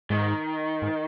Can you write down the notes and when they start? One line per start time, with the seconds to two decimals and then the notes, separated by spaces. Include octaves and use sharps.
0.10 G#2 D#3
0.82 G#2